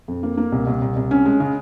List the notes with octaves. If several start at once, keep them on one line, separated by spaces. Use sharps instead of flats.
F2
A#3
A#3
C2
C2
C2
C2
C#4
G#3
C#3